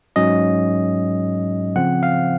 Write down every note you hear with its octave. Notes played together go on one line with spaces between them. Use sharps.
G#2 F#3 C#4 D#5
C#3 F3 C4 F#5
F5